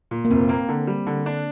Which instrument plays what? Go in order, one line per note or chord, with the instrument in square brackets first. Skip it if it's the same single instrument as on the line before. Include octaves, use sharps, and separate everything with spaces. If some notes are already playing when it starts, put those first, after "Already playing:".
[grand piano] A#2
[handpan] A#3
[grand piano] F1 [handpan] C4
[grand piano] A#3
D3
G3
D3
D4